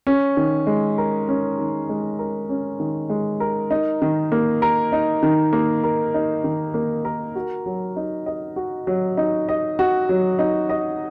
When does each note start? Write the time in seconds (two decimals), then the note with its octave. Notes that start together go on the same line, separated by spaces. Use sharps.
0.07 C#4
0.37 D#3
0.67 G#3
0.98 A#4
1.29 C#4
1.59 D#3
1.89 G#3
2.19 A#4
2.49 C#4
2.80 D#3
3.10 G#3
3.40 A#4
3.71 D#4
4.02 D#3
4.32 A#3
4.62 A#4
4.92 D#4
5.23 D#3
5.53 A#3
5.84 A#4
6.14 D#4
6.44 D#3
6.74 A#3
7.05 A#4
7.35 F#4
7.66 F#3
7.96 D#4
8.26 D#5
8.56 F#4
8.87 F#3
9.17 D#4
9.49 D#5
9.79 F#4
10.09 F#3
10.39 D#4
10.69 D#5